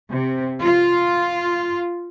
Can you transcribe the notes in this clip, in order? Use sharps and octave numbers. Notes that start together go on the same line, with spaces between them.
C3
F4